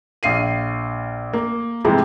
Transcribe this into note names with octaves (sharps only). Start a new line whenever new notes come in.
A#1 F5 C7 D#7
A#3
G#2 C3 E3 F3 G#3 A3